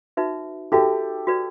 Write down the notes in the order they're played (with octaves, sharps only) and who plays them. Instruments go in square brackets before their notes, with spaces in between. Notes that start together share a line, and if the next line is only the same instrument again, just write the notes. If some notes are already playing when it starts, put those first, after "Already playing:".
[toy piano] D#4 F#4 B4 E5
[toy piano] D#4 F#4 B4 E5 [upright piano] G4 A4
[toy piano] F#4 B4 D5